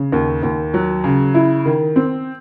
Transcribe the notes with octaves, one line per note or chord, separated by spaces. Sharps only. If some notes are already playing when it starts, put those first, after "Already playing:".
Already playing: C#3
D#2
D#2
F#3
C#3
E4
D#3
C4